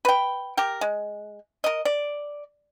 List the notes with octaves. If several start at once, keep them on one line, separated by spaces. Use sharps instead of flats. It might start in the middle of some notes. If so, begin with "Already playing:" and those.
B4 G5
G4 A#4
G#3
A#4 D#5
D5